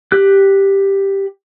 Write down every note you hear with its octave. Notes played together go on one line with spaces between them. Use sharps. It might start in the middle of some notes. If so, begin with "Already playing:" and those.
G4 F#6